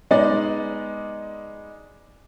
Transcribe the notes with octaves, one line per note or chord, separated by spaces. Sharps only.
G#3 B3 D#4 D5